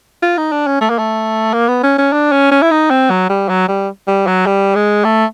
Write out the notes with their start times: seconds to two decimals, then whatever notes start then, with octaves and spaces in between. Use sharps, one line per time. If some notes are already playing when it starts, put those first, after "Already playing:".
0.23 F4
0.38 D#4
0.52 D4
0.67 C#4
0.81 A3
0.90 A#3
0.99 A3
1.54 A#3
1.69 B3
1.83 C#4
1.98 C#4
2.13 D4
2.32 C#4
2.52 C#4
2.62 E4
2.71 D#4
2.91 C4
3.10 F#3
3.30 G3
3.49 F#3
3.68 G3
4.08 G3
4.27 F#3
4.46 G3
4.75 G#3
5.05 A3